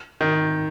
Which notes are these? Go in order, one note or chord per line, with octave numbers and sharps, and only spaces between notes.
D#3